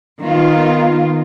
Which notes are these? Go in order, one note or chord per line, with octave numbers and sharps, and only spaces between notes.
D#3 B3 F4